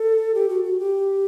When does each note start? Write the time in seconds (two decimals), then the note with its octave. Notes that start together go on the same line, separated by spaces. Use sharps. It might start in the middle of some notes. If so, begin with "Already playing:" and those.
Already playing: A4
0.34 G4
0.49 F#4
0.64 F#4
0.79 G4